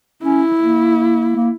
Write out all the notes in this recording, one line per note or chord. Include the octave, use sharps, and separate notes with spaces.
C#4 E4
A#3
A#3